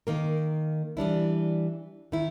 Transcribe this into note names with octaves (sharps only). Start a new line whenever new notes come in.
D#3 A#3 A#4
E3 G3 D4 E4
D#3 E4